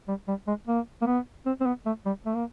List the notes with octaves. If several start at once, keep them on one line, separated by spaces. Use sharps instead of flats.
G3
G3
G#3
A#3
A#3
B3
C4
C4
B3
A3
G3
A3
A#3